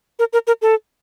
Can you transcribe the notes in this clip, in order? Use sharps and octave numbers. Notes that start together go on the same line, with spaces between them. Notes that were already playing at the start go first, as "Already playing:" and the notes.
A#4
A#4
A#4
A4